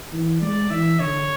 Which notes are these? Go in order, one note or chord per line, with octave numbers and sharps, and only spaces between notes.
E3
G#3 D5
E3 E5
D3 C#5